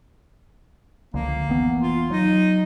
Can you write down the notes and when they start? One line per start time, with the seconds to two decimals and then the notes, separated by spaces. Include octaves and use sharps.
1.14 C#2 D3 F3 A#3
1.48 F1 E3 B3
1.82 F4
2.10 F#3 D#4